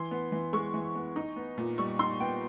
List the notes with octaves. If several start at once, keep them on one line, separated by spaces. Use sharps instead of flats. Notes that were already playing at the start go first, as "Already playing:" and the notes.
Already playing: E3 C6
B3
E3
G#3 C#6
E3
B3
D#4
B3
A#2
G3 C#6
D#4 C6
B3 G5